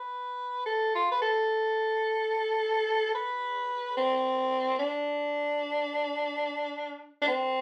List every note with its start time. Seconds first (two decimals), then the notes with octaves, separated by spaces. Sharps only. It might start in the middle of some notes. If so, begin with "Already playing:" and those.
Already playing: B4
0.66 A4
0.95 F4
1.11 B4
1.22 A4
3.15 B4
3.97 C4
4.79 D4
7.22 D4
7.28 C4